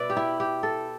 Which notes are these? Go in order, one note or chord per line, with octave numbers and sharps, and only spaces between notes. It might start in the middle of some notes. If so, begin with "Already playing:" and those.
Already playing: B2 B4 D5 E5
G4
E4
G4
A4